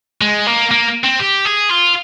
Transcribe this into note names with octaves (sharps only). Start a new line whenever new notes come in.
G#3
A#3
A#3
C4
G4
G#4
F4